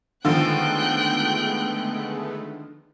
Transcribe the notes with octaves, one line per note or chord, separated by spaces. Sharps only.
D3 D#3 F3 G#3 A3 B3 G5 F#6